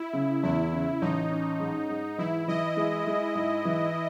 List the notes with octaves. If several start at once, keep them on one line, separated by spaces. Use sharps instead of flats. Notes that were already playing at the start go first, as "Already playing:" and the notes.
Already playing: E4
C#3
E2 E4
C#3
A1 D#4
C#4
G#2
G#2
E3 E4
E3 D#5
G#3
G#3
G#2
E3